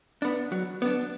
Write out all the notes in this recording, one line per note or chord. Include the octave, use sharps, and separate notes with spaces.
B3 D4
F#3
B3 D4